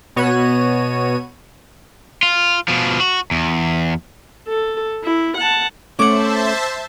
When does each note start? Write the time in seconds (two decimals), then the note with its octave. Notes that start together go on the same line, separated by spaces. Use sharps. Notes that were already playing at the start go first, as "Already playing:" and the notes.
0.16 B2 B3 F#4 C#5 D#7
2.23 F4
2.68 B2 F3
3.00 F#4
3.31 E2
4.48 A4
5.04 E4
5.38 F#5 A5
5.99 A3 C#4 C5 C#5 E5 F#5 A5 D6